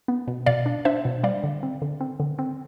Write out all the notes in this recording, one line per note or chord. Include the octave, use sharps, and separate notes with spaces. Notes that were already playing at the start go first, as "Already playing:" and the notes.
B3
B2
B2 D5 F5
D4
D4 C5 E5
B2
G3 D5 F5
D3
C4
D3
C4
D3
C4